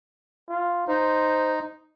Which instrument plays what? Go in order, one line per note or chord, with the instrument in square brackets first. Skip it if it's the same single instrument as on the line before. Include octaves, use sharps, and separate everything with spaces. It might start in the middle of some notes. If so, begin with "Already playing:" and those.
[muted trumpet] F4
[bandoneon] D#4 [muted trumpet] C5